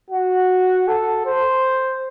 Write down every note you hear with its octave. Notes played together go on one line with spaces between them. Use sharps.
F#4
A4
C5